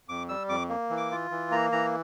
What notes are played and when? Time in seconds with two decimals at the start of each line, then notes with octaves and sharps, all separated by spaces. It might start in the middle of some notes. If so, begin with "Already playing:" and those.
0.08 F2 D6
0.29 G3 E6
0.49 F2 D6
0.69 A#3
0.90 E3
0.97 D6
1.11 F4
1.31 E3
1.51 A#3 A#5
1.72 E3 A#5